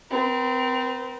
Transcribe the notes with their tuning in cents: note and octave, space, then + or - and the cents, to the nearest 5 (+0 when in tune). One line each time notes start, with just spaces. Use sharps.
C4 -25 A#4 +40